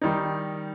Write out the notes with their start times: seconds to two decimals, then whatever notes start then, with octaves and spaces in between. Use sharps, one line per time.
0.02 D#3 G3 D#4